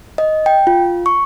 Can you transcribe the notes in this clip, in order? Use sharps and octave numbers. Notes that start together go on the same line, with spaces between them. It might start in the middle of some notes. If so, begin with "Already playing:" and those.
D#5
G5
F4
C#6